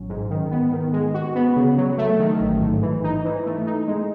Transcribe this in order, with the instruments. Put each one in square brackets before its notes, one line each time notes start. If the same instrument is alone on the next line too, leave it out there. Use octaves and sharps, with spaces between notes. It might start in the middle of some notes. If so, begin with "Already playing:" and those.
Already playing: [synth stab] A1 F#3 C#4
G#2
D#3
B3
D#3
G#3
F#4
B3
C#3
F#3
A3
D#3
A1
G#2
E3
D#4
E3
A3
D#4
G#3